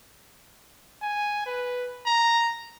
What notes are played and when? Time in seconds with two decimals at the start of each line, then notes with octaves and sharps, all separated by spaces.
1.02 G#5
1.46 B4
2.07 A#5